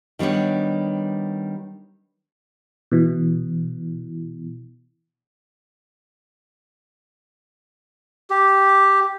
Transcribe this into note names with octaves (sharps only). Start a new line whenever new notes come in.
D#3 G3 B3 D4 C#5
B2 E3
G4